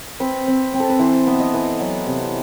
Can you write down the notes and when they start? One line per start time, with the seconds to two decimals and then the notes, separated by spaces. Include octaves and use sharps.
0.20 C4 B4
0.48 C4
0.74 C4
0.80 A4
0.90 B4
0.99 E3 C5
1.27 B3 E5
1.40 D#5
1.54 E3
1.79 F#3 F#5
2.07 C3